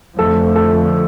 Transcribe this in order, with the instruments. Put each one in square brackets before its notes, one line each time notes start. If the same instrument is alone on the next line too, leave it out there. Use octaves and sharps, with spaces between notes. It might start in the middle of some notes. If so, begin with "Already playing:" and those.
[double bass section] F2 D3 F3 A3 [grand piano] A4
[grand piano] A4